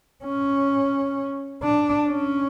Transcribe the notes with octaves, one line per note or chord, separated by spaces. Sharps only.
C#4
D4
C#4